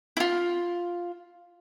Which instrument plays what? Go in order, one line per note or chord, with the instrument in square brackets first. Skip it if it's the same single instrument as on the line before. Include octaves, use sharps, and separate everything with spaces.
[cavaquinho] E4 F4